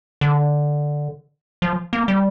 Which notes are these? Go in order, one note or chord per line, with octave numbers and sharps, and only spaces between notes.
D3
F3
A#3
G3